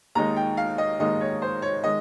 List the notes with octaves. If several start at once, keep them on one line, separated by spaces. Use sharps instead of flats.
D#2 D#3 G#3 D#4 A#5
G5
F5
D#5
D#2 D#3 G#3 D#4 D#5
C#5
C5
C#5
D#3 G#3 D#5